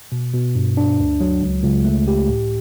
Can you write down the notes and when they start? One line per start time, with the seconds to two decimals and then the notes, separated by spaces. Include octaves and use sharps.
0.12 B2
0.34 B2
0.55 G2
0.77 D4
0.99 D2
1.20 F#3
1.42 C#2
1.64 C#2
1.85 A3
2.08 G4
2.29 A2